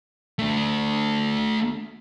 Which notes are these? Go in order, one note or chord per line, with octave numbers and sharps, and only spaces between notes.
A3 D4